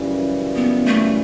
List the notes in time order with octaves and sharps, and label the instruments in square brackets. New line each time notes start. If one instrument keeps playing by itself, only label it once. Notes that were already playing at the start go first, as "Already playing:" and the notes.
Already playing: [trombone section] F#2 C#3 E3 G3
[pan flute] B3
A3